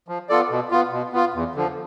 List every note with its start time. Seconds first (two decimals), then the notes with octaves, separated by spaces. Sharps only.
0.08 F3
0.29 B3 F4 A4 D5
0.50 B2
0.71 B3 F4
0.92 B2
1.13 B3 F4
1.34 E2
1.55 D3 F3